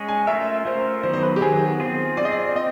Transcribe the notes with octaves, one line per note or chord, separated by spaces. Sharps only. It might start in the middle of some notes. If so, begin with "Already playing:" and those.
Already playing: G#3 C#4 G#4
G#5
A3 C#4 F4 A#4 E5
A3 C#4 F4 A#4 C5
D#3 F#3 B3 C5
C5
B4
G4
D#3 F#3 B3 G#4
C4 F4 G#4
C4 F4 G#4 D5
D#5
D5
C4 D#5